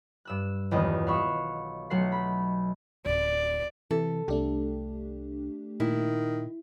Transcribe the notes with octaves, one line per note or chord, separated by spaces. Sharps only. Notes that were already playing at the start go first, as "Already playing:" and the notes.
G2 E6 F#6
D#1 B1 E2 D#5 D#6
F5 F#5 B5 C#6 E6
B1 F#3 A3 F#5 C6 C7
B5
D1 D5
C3 E3 A4
C2 A3 D4 G4
A#2 D#3 E4